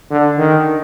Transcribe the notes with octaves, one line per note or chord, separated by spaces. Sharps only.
D3
D#3